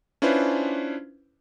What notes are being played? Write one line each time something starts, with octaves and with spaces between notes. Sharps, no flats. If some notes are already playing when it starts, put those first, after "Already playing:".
C#4 D4 E4 F4 B4 C5